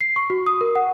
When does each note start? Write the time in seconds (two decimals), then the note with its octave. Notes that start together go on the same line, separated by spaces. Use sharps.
0.01 C7
0.16 C#6
0.30 F#4
0.46 D#6
0.61 A#4
0.76 F#5